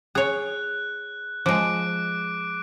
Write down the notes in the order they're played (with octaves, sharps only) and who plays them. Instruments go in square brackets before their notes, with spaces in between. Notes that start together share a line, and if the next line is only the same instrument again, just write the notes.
[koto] G#4 C#5 [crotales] F#6
[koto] F3 G#3 [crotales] D6 F#6 D7